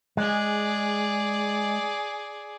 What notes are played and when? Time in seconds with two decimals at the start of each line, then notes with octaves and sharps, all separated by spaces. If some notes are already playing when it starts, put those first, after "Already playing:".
0.17 G#3 G#4 D5